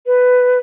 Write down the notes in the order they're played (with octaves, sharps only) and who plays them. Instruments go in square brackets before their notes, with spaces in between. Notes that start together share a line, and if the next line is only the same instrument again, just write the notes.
[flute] B4